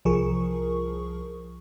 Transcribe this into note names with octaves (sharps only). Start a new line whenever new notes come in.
C2 F3 G#4 A#4 C#6